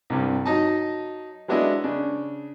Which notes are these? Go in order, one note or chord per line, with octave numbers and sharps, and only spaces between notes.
C2 G2 C3
F#3 D#4 D#5 A5
F#3 G#3 B3 D4 E4 D#5
C#3 D4